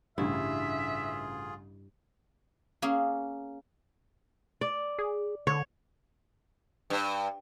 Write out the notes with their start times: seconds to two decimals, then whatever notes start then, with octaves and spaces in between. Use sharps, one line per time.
0.18 A1 G2 C#3 E4 F4 G#4 E5
2.82 A#3 C#4 G#4
4.61 D5
4.99 G#4
5.47 D3 C#5
6.90 G2